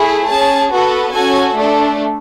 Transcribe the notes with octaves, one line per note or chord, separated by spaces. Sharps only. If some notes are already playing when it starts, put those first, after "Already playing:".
Already playing: A3 E4 G#4
C#4 G#4 A5
B3 F#4 A4
C#4 F#4 A4 G#5
A3 D4 A4